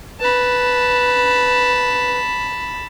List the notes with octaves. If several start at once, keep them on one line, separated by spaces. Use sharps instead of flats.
B4 A5 B5